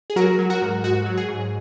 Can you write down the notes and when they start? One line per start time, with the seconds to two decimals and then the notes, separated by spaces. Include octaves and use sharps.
0.10 G#4
0.16 F#3 F#4 A#4
0.39 F#3
0.50 F#4 A#4
0.61 G#2
0.84 G#2 F#4
1.06 F#3
1.17 G#4
1.29 G#2